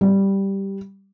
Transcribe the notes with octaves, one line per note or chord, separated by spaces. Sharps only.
G3